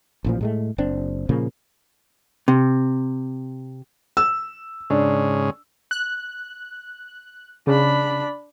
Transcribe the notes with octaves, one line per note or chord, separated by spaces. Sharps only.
A1 A#2 F3
A2 G#3 A3
F#1 C4 D4
A#2 C#3 F3 A#3
C3
E6
G#2 C#3 D4
F#6
C#3 D4 B5